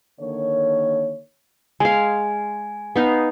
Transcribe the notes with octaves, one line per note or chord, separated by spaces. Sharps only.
D3 D#3 A#3 C#5
G#3 F5 G#5
B3 D#4 F5